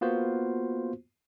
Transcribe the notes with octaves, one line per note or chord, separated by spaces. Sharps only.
A#3 B3 F4 F#4 C5